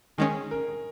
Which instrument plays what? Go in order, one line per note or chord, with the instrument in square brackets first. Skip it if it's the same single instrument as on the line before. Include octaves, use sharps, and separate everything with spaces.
[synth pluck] D#3 G#3 C#4 [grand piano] G#4
[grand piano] A#4